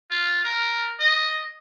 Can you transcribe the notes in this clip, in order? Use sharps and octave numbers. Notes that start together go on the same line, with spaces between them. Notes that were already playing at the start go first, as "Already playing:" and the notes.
F4
A#4
D#5